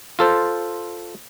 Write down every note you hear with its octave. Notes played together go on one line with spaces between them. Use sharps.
F4 A4 C5